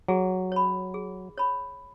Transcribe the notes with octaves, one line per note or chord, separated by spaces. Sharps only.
F#3 G#4
C#5 B5
G#4
C#5 B5